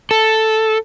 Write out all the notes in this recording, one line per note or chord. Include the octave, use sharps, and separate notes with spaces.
A4